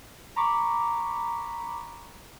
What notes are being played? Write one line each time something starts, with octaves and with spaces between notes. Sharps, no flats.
A#5 B5 C#6 D6